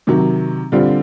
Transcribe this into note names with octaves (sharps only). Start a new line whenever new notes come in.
C3 D#3 F#3
D3 G3 C4 F4